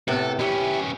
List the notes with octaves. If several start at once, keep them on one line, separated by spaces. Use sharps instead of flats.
A2 C3 B3 A4
B3 C#4 E4 G4